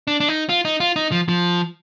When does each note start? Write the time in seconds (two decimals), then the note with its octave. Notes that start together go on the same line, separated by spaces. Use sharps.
0.07 D4
0.20 D4
0.29 D#4
0.49 F4
0.65 D#4
0.80 F4
0.96 D#4
1.12 F3
1.28 F3